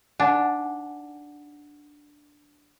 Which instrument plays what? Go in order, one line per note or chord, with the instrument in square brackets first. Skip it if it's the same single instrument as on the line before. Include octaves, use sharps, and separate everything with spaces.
[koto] D4 [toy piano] D#4 F#5 G#5